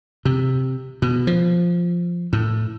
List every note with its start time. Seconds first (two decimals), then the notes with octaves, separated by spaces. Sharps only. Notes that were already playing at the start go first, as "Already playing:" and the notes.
0.25 C3
1.02 B2
1.27 F3
2.33 A2